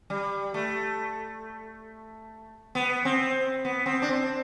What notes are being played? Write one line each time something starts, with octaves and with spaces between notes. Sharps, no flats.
G3
A3
B3
C4
B3
C4
D4
C4